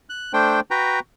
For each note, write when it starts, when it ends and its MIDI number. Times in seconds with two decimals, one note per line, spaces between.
0.09 0.33 90
0.33 0.60 57
0.33 0.60 62
0.33 0.60 72
0.33 0.60 79
0.71 1.00 66
0.71 1.00 71
0.71 1.00 79
0.71 1.00 82